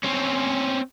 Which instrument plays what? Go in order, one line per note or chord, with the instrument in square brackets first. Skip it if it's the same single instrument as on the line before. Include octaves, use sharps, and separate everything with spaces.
[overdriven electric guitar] C4 C#4